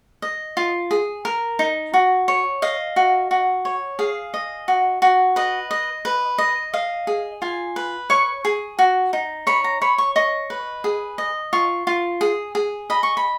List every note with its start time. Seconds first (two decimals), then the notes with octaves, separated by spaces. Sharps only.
0.22 D#5
0.57 F4
0.91 G#4
1.25 A#4
1.59 D#4
1.94 F#4
2.28 C#5
2.62 D#5 F5
2.96 F#4
3.31 F#4
3.65 C#5
3.99 G#4 F5
4.34 D#5
4.68 F#4
5.02 F#4
5.36 B4 D#5
5.71 D#5
6.05 B4
6.38 D#5
6.73 D#5 F5
7.07 G#4
7.42 F4 G#5
7.76 B4
8.10 C#5 C#6
8.45 G#4
8.79 F#4
9.13 D#4
9.47 C#5 B5
9.64 A#5
9.82 C#5 B5
9.98 C#6
10.16 D#5 C#6
10.50 B4
10.84 G#4
11.18 D#5
11.53 F4 C#6
11.87 F4
12.21 G#4
12.55 G#4
12.90 D#5 B5
13.03 C#6
13.17 B5